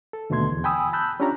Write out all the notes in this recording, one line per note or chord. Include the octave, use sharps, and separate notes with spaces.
A4
D#2 B2 D3 A3 C6 G#6
E2
G5 G#5 B5 D#6 E6
A5 B5 E6 F#6 G6
C#4 D4 F4 G4 C#5 A#5